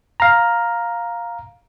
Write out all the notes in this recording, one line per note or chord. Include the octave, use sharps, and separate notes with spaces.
F5 A#5